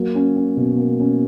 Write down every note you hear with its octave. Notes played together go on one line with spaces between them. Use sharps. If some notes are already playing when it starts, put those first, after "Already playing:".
Already playing: F#3 A#3
C#4
C#4
B2
A#3
C#4